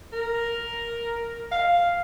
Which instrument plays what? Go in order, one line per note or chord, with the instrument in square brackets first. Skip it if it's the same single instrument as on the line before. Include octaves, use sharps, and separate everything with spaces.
[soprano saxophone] A#4
F5